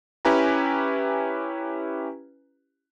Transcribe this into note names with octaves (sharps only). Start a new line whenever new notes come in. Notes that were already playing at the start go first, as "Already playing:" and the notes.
C#4 E4 G4 B4 G#5 A#5